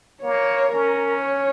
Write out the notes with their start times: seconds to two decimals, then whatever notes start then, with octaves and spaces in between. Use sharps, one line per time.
0.23 A#3 C#5
0.72 C#4 A#4
1.21 C#5